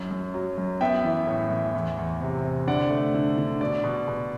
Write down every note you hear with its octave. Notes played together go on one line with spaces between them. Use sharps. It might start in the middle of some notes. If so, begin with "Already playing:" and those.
Already playing: F#2
F#2
F#3
F#2
B3 E5 G5
E3
A2
E3
E2
E2
C3
C3
D3 D5 F#5
A3
D3
D3
B2 D5
B2
B2